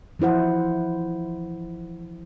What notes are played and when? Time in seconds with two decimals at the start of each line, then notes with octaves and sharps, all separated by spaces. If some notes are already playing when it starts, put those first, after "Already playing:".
0.19 E3 F3 E4 C5 F#5